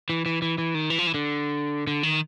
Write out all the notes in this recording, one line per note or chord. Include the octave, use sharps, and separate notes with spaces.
E3
E3
E3
E3
D#3
E3
F3
E3
D3
D3
D#3